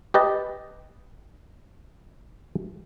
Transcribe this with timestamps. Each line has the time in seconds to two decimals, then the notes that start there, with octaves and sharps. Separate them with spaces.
0.14 G4 B4 D#5 A5